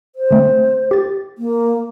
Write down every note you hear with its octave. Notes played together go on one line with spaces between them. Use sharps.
C5
D3 A3 C4
G4 A6
A#3